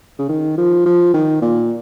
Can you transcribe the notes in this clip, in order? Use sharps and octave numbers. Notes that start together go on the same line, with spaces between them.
C#3
D#3
F3
F3
D#3
A#2